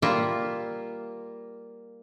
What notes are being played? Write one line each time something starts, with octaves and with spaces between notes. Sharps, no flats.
G3 A#3 F4 A#4 E5